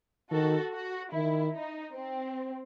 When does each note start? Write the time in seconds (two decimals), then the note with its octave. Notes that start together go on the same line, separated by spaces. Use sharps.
0.31 D#3 F#4 A4
0.73 F#4
1.13 D#3 E4
1.54 D#4
1.95 C4